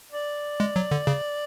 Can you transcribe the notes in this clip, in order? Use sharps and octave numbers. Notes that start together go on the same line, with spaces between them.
D5
G#3
F#3
D3
C#3